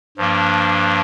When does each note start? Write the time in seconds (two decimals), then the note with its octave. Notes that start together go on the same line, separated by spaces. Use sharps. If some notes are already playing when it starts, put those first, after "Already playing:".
0.17 G2 F3 A#3 D4